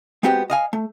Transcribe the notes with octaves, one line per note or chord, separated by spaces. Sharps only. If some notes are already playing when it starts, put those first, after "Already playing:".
G#3 B3 C4 F#4 G4 G5
D#5 F5 G#5
A3